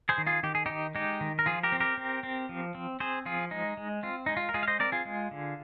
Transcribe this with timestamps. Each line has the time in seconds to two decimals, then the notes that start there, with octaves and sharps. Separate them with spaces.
0.09 G#4 C5
0.18 D#3
0.27 F4 G#4
0.43 D#3 G4
0.55 G#4
0.66 D#3 D#4 G4
0.95 G#3 D#4 G4
1.21 D#3
1.39 A#4
1.46 F3 F4 G#4
1.63 G4 A#4
1.72 C4
1.80 G4 A#4
1.98 C4
2.23 C4
2.49 F3
2.75 C4
3.00 C4 G#4 C5
3.26 F3 F4 G#4
3.51 G#3 D#4
3.77 G#3
4.03 C4 F4
4.26 G#3 D#4
4.37 F4
4.49 A#4
4.54 G#3 F4 G#4
4.63 F5
4.67 C5 D#5
4.79 C4 A#4 D5
4.92 F4 G#4
5.05 G#3
5.31 D3